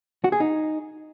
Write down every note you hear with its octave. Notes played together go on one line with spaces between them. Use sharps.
F#4
G#4
D#4